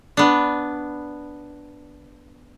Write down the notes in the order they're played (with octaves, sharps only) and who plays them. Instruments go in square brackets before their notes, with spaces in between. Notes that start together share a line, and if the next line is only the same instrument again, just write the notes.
[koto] B3 D4